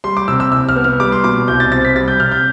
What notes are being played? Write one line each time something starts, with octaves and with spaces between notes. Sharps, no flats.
G3 C6
D6
C3 E6
E6
C2 E6
F6
B3
F6
G3 D6
C6
B2 D6
C2 G6
A6
C4 A6
B6
G3 A6
G6
C3 F6
G6